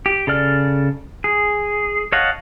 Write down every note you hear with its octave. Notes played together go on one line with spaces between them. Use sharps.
G4
C#3 A4 D5 F6
G#4
C#5 D#5 F5 F#5 A5